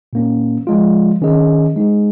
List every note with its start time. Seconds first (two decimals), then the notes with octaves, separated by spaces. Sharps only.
0.13 A#2 A#3 C#4
0.67 F3 G#3 F4
1.21 D#3 C#4 G#4 D#5
1.76 G#3 D#4 G#4